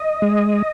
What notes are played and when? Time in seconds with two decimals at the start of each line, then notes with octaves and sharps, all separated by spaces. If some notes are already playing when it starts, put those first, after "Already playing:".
Already playing: D#5
0.22 G#3